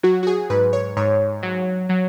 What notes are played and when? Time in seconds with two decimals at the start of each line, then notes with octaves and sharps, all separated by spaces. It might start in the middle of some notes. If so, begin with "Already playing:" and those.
0.03 F#3 F#4
0.23 F#4
0.27 G#4
0.50 G#2 B4
0.73 C#5
0.97 G#2 C#5
1.43 F#3
1.89 F#3